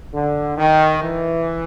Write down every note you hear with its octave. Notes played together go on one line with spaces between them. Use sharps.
D3
D#3
E3